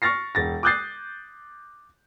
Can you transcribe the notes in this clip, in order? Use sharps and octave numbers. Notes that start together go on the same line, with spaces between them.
C#6 F6 A6 A#6 C7
E1 A6 A#6
D6 D#6 F#6 G6 A6 C7